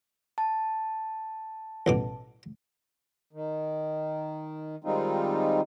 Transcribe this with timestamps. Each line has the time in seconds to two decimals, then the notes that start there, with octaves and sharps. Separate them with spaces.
0.38 A5
1.86 A1 B2 D6
3.33 D#3
4.84 D#3 G3 G#3 C4 D#4 F4